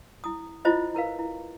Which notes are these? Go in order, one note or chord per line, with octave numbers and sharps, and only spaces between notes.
E4 D#6
E4 F4 C5 D#5
E4 A#4 B4 F5
E4